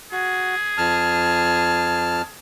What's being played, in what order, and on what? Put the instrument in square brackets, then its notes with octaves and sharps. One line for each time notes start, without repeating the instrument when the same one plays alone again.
[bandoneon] F#4 [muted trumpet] G#4
[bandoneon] F2 A5 F6